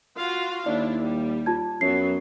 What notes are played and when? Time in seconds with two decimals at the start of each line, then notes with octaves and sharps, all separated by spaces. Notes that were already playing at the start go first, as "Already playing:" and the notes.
0.17 F4 F#4 F5
0.66 D#2 D4 E4 D5
1.02 G3
1.46 F4 A5 G#6
1.81 F#2 F#3 B3 C7